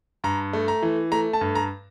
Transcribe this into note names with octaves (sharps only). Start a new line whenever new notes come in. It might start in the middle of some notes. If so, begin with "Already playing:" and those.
G2 A#5
A3
A#5
E3
A3 A#5
A5
G2
A#5